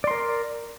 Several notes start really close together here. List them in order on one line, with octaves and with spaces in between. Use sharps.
D5 C6 A#4